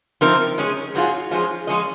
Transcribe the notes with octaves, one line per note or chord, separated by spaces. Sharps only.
C3 F3 C4 D#4 A#4
G#3 C#4 G#4
G#2 F#3 C4 F4 G#4
F3 G#3 C#4 F4 G#4
F3 G#3 C#4 G#4 D#5